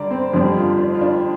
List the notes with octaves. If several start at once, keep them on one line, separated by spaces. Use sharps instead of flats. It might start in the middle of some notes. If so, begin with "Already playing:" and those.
Already playing: D3 G3 D5 A#5
C4
F2 D3 G3 D4
F4
D4
F4
D4